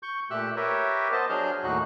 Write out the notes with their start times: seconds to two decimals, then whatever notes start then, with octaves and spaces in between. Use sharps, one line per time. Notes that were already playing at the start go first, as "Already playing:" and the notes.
0.03 C#6 G6
0.30 A#2 A3 G4 E6 F#6
0.56 G4 A#4 B4 C#5 E5
1.12 B3 C5 D#5 A5
1.30 F#3 D4 G#4 F6 G6
1.63 D#2 A2 D#4 F#4 F#6